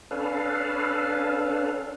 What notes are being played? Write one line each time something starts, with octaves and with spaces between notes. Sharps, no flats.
C#4 D4 A4 B4 F5